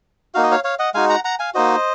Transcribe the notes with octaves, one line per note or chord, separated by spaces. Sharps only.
A#3 D#4 F#4 F5
D#5
C#5 F5
C#5 F5
D#5 F#5
G#3 D#4 F#4 F5 G#5
F#5 A#5
F#5 A#5
F5 G#5
A#3 D#4 F#4 C5 D#5